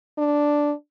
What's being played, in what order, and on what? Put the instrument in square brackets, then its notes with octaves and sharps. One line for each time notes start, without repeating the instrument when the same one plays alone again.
[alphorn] D4